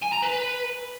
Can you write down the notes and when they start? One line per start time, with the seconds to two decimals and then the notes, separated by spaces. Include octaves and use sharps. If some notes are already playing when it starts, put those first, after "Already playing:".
0.02 G#5
0.12 A#5
0.22 B4